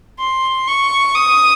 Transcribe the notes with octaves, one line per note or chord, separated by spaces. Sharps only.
C6
C#6
D#6